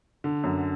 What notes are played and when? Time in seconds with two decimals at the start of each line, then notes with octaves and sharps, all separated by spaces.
0.24 D3
0.44 F#2